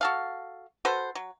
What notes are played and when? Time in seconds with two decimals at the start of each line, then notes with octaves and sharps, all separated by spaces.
0.01 F#4 A4 F5
0.85 F#4 A4 B4 C5
1.15 F#3